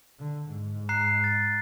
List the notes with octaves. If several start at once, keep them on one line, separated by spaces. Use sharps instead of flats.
D3
G#2
A#5 F#6 C7
A6